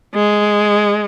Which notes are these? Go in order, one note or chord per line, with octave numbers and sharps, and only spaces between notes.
G#3